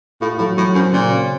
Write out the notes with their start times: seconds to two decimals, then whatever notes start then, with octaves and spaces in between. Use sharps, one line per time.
0.22 A2 F4
0.38 A2 F#3
0.57 A2 F#3
0.75 F#2 C4
0.93 A#2 C#3
1.11 C#4